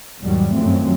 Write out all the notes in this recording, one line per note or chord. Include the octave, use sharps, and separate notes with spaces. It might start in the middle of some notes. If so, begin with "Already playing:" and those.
E2 G#2 D#3 F#3 G3
F#2 D#3 F3 F#3 A3 C4